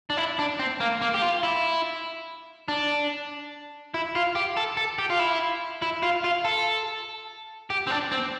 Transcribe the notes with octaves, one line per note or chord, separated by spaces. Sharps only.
D4
E4
D4
C4
A#3
A#3
G4
F4
E4
D4
E4
F4
G4
A4
A4
G4
F4
E4
E4
F4
F4
A4
G4
C4
D4
C4